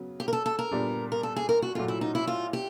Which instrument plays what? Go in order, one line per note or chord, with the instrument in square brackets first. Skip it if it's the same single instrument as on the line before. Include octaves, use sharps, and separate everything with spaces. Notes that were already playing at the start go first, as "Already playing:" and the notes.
Already playing: [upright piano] C#3 F#3 B3
[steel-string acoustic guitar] G4
A#4
A4
A4
A#4
[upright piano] A#2 G3 B3 D4
[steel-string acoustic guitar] A#4
A4
G#4
A#4
F#4
[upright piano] A#2 F#3 A3 [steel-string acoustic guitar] F4
[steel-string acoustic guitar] E4
D#4
E4
F4
G4